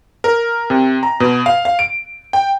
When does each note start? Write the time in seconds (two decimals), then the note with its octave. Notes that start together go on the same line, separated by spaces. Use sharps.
0.24 A#4
0.70 C3
1.03 A#5
1.20 B2
1.46 F5
1.65 F5
1.79 D7
2.33 G5